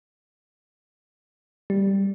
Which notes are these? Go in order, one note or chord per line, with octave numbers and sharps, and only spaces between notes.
G3